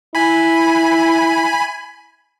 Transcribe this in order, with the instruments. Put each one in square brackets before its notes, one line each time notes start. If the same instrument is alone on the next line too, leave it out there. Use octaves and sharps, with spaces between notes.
[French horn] E4 [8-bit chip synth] G#5 B5